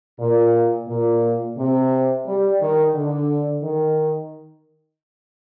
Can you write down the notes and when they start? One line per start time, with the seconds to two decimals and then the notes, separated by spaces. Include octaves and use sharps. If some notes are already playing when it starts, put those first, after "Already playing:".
0.18 A#2
0.87 A#2
1.57 C3
2.26 G3
2.60 D#3
2.93 D3
3.63 D#3